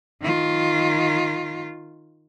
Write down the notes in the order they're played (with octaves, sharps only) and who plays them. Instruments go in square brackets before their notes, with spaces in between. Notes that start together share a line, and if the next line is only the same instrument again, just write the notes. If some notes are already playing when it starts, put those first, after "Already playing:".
[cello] D#3 F4